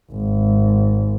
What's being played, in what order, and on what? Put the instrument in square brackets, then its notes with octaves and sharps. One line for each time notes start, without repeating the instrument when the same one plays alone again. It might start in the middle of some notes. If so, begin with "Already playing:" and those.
[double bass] G#1